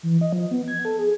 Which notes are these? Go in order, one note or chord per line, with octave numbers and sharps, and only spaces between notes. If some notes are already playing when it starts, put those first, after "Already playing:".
E3
D#5
F3
B3
G#6
A4
G#4